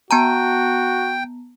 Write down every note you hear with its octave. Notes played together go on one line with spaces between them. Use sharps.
B3 F#4 G5 A5 A#5